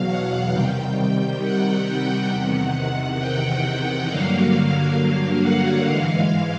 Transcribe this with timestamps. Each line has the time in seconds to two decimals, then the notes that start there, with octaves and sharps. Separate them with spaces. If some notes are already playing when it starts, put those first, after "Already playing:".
Already playing: E2 B2 F#3 F5
0.08 F#5
0.53 C3 D#3 G3 G5
1.42 F#5
1.87 G5
2.30 E2 C3 D#3 F#5
3.19 G5
3.64 F#5
4.09 G2 D3 F#3 A#3 F5
4.98 F5
5.43 F#5
5.87 G#2 E3 G#3 F5